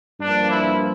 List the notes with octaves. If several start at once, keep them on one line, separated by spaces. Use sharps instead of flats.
G2 F3 A#3 D4
E4